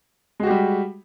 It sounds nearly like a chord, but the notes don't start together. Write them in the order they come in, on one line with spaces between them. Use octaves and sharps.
G#3 F#4 G4 G3